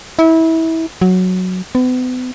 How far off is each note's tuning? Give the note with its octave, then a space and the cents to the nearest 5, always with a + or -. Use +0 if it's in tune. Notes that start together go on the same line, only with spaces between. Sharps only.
E4 -25
F#3 -5
B3 +40